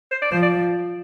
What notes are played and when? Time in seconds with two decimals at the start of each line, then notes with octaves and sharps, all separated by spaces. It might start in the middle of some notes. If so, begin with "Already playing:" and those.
0.11 C5
0.22 D5
0.32 F3 C5
0.42 D5